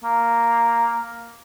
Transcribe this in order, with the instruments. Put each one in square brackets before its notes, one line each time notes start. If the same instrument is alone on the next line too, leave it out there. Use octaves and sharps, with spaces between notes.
[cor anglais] A#3